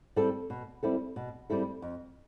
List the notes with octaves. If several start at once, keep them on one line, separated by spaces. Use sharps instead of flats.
G3 C4 E4 A4
B2
G3 C4 E4 A4
B2
G3 C4 E4 A4
F2